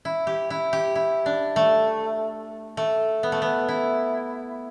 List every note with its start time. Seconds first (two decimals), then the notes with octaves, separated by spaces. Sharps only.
0.05 E4
0.27 G4
0.50 E4
0.73 G4
0.96 E4
1.26 D4
1.56 A3
2.77 A3
3.23 B3
3.32 A3
3.42 B3
3.69 E4